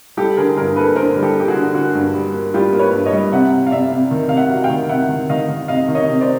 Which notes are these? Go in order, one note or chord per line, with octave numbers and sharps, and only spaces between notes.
G3 G4 A4
D3 G#4 A#4
G2 G#4 A#4
A#3 A4 B4
D3 A#4 C5
G3
G4 A4
A#3 G4
F#4 G#4
D3
A#3 F#4
G2
G3
A#3
G3 F4 G4
A#3
B4 C#5
G2
C#5 D#5
G3
C3 E5 F#5
C3
F5
C3 D5 E5
C3
D#3
C3 F5
E5 F#5
F#3
F5 G5
D#3
C3 E5 F#5
D#3
D#3 D#5 F5
D#3
C3 D#5 F5
D#3
C#5 D#5
C3
C5 D5